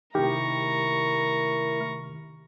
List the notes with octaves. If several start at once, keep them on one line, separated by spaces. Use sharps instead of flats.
C3 D#3 A3 E4 G4 A#4 A#5 C#6